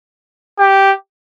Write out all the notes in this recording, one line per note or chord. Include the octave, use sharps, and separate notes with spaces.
G4